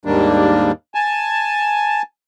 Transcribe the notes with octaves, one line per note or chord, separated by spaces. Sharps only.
D#2 G#2 D#3 G3 A#3 D4
G#5 A5